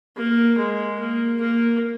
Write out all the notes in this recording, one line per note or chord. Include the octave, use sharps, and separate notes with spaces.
A#3
G#3
A#3
A#3